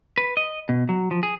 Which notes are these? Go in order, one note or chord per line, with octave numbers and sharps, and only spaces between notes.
B4
D#5
B2
F#3
F3
G#4